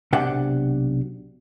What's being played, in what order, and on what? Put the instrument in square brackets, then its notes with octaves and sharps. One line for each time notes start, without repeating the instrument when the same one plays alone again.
[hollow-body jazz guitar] B1 C3 D4 F#5 G5